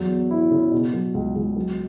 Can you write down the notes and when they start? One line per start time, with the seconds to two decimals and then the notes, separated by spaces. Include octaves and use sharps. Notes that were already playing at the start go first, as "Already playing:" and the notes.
Already playing: E2 F#3
0.09 B3
0.31 E4
0.51 C#3
0.71 B2
0.93 F#3
1.14 C#2
1.36 C#2
1.56 F#3